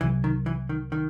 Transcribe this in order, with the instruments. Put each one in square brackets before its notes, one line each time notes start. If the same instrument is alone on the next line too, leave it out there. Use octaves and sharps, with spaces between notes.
[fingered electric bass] C2 C3 F#3 [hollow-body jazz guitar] E3
[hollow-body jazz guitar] D#3
E3
D#3
D#3